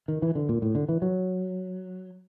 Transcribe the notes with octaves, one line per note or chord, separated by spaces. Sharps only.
D#3
E3
D3
A#2
A2
D3
E3
F#3